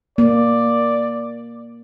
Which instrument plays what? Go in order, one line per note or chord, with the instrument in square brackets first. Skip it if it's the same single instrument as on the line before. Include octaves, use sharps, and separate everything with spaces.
[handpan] A#3 [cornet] D5